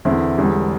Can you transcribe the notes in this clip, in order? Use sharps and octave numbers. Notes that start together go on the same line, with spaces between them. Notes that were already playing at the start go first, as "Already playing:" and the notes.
E2 D3 C4 E4
E1 E2 D3 G3